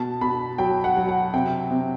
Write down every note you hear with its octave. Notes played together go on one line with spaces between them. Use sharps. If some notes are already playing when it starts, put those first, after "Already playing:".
Already playing: B2 A5
B2 B5
F#3 G5
F#5
F#3
F#5
C3 G5
C3